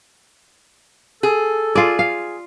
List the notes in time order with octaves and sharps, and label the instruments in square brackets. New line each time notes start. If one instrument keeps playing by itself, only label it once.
[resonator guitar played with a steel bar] G#4 [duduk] A4
[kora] F4 D5 [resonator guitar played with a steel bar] G#4
[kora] F5